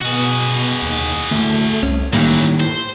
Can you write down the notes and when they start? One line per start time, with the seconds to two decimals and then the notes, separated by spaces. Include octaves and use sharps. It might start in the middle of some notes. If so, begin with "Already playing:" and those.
0.02 B2 F#4 G#4
0.82 D#2
1.31 D2 A2 A3
1.83 C2 C#4
2.13 A2 D#3 E3 F#3 G3 A#3
2.60 C5